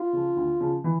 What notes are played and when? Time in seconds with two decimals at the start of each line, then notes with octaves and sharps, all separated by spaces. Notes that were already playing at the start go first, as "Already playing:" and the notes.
Already playing: F4
0.13 C#3 F3
0.36 D2
0.61 C#3 F3
0.84 E3